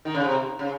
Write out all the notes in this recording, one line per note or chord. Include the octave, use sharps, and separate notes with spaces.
D#3
C#3
C3
C#3